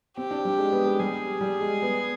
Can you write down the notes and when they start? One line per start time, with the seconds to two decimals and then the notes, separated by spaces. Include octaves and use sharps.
0.17 C4 G4
0.31 D4
0.45 G3
0.58 G#3
0.72 B3
0.85 G#3
0.99 G3 G#4
1.41 G3
1.61 G#3
1.82 B3